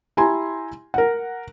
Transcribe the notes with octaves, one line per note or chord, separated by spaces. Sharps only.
E4 G4 G#5 A#5 C6
A#4 F#5